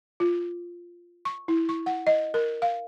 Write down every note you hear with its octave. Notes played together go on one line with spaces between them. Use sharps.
F4
C#6
E4
C#6
F#5
D#5
A#4
F5